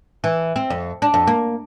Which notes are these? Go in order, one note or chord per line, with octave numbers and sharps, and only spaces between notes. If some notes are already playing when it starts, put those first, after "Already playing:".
E3
C4
F2
D4
F2
A#3